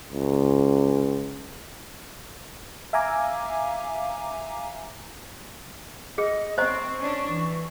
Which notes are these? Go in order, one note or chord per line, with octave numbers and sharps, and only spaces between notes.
C#2
E5 F5 G#5 A#5 D6
G#4 D#5
C4 C5 D#5 A#5 C#6
C#4 D4
E3